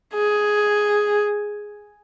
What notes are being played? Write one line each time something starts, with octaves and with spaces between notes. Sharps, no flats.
G#4